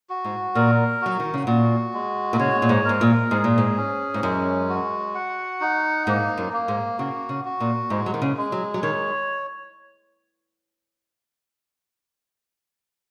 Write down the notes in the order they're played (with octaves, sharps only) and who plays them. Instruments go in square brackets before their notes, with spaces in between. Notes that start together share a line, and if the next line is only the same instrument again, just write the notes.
[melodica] F#4
[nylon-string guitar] G#2
[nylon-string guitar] A#2 [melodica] A#4
[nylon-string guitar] F#3 [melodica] F#4
[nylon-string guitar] D#3
C#3
[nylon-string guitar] A#2 [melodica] F#4
[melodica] G#3
[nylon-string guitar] A#2
[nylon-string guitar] C#3 [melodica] C#5
[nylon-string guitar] A#2
G#2
[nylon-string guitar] G#2 [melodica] A#4
[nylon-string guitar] A#2
[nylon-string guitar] G#2 [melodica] G#4
[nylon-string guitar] A#2
G#2
[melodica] C#4
[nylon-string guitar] G#2
[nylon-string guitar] F#2 [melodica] G#3
[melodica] F#4
F#5
D#4
[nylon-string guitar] G#2 [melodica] A#3
[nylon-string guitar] F#2
[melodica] A#3
[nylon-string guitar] G#2
[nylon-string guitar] C#3 [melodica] F#4
[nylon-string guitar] C#3
[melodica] F#4
[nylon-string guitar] A#2
[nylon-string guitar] G#2 [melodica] G#3
[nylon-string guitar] F#3
D#3
C#3
[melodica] G#3
[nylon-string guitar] F#3
F#3
[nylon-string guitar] D#3 [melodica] C#5